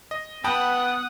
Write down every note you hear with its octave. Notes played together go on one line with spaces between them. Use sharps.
D#5
B3 F#5 G5 A5 B5 D#6